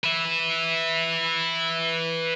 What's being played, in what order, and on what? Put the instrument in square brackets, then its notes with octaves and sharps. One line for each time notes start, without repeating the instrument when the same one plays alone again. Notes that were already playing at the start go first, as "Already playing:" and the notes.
[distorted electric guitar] B4 E5